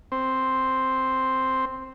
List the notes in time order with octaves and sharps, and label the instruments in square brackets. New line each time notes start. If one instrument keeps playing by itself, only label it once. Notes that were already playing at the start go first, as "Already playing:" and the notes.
[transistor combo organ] C4